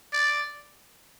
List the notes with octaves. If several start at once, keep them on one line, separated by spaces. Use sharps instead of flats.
D5